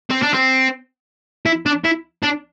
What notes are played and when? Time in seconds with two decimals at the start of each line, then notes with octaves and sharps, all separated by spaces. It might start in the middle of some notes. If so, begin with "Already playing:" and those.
0.11 C4
0.23 D4
0.34 C4
1.46 E4
1.66 D4
1.85 E4
2.24 D4